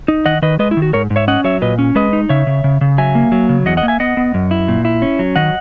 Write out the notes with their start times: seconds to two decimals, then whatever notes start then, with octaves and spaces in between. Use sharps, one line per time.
0.08 D#4
0.26 D#3 D#5 F#5
0.42 D#3 B4 D#5
0.59 G#3 B4 D#5
0.71 E4
0.77 D#3
0.82 F#4
0.93 G#2 A#4 C#5
1.10 G#2
1.16 C#5 E5
1.28 C#4 D#5 F#5
1.44 F#3 C#5 E5
1.62 A#2 B4 D#5
1.79 C#4
1.95 G#3 B4 D#5
2.13 D#4
2.29 C#3 C#5 E5
2.47 C#3
2.64 C#3
2.81 C#3
2.98 F#3 E5 G#5
3.15 A#3
3.32 F#3
3.49 C#3
3.66 E2 D#5 F#5
3.77 D#5 F#5
3.83 A#3
3.88 E5 G#5
4.00 B3 D#5 F#5
4.17 B3
4.34 F#2
4.51 E4
4.68 A#2
4.85 E4
5.02 C#4
5.19 F#3
5.36 D#3 D#5 F#5